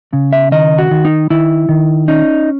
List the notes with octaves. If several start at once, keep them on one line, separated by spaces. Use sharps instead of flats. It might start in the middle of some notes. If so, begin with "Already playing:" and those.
C#3
E5
D#3 D#5
F#4
D#3
D#4
D#3 E4
D#3
C#4 D#4